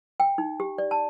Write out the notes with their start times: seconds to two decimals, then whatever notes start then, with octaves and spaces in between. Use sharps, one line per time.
0.20 G5
0.38 D#4
0.60 G4
0.78 D5
0.91 A5